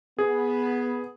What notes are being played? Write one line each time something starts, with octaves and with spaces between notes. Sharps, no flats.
B3 G#4